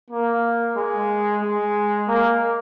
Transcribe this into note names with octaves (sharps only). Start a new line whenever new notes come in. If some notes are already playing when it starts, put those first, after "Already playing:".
A#3
G#3
G#3
A#3